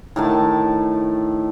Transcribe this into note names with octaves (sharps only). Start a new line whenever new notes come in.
A2 D#3 A5